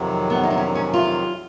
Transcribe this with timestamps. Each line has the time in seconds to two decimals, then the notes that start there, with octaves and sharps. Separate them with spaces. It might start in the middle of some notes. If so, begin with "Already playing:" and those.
Already playing: F2 C3 D#3 F#3
0.30 B3
0.43 D#4
0.51 D4
0.58 C#4
0.75 C#4
0.94 F4